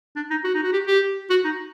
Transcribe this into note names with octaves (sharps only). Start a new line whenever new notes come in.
D4
D#4
F#4
D#4
F#4
G4
G4
F#4
D#4